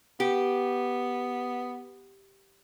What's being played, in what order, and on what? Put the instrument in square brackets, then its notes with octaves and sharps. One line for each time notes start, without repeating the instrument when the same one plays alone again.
[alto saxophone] B3 [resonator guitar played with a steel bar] G4